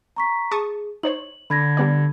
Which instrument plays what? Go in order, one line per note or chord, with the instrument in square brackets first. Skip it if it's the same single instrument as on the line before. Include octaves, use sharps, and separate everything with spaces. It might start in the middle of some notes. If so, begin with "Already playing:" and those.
[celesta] A#5 C#6 B6
[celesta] G#4 [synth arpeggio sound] A5 C#6 D#6
[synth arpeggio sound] D#4 C5 C#5 [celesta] F#7
[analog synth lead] D3 [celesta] B5 G#6 A#6
[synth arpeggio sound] G3 B3 D5